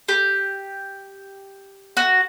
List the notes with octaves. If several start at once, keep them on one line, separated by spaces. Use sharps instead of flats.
G4
F#4